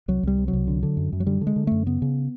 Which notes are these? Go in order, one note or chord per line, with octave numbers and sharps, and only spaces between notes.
C2 F#3
C2 G3
C3
F#3
C2
D3
D3
F#2
F#2
F#3
D3 G3
D3
G#3
D3
F#2 A3
C#3 B3
C#3